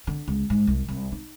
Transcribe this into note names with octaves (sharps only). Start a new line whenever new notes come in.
D3
C#2
G#2
C2
C2
D#4